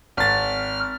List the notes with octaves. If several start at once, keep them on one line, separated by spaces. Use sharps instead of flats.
G#1 F6 A6